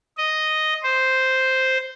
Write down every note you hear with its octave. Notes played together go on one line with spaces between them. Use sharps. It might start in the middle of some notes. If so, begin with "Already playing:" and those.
D#5
C5